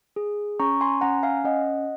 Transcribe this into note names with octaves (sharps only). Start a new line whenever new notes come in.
G#4
C#4 A#5 C#6
G#5 C6
C#4 F#5 A#5
F5 G#5
C#4 D#5 F#5